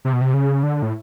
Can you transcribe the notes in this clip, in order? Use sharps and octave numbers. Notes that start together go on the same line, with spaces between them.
C3
B2
C3
C#3
D3
A2